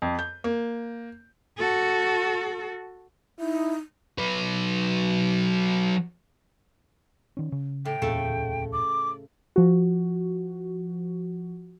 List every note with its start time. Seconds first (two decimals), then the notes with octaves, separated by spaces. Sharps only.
0.02 F2
0.19 G6
0.44 A#3
1.58 F#4 A4
3.40 D#4 E4
4.18 F#3 B4
7.37 D#3 C#4
7.52 C#3
7.85 A2 G5
8.02 D1 E2 A#2 C#3 A3 A4
8.73 D6
9.56 F3 F#4